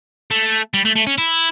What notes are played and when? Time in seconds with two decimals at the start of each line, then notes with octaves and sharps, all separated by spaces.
0.31 A3
0.74 G3
0.85 A3
0.96 A3
1.07 C#4
1.18 E4